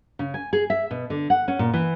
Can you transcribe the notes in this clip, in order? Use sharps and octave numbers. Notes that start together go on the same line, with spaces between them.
C#3
G#5
G#4
E5
B2
D3
F#5
C#4
A#2
E3